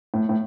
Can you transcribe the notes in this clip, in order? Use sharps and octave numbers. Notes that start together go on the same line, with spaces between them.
A2
A2